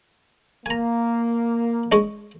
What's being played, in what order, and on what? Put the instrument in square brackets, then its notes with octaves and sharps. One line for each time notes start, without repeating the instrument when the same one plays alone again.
[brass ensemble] A#3 [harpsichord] G#5 A#5
[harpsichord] G#3 C#4 D4